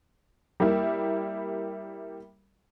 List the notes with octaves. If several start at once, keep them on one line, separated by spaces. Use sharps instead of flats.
G3 A#3 E4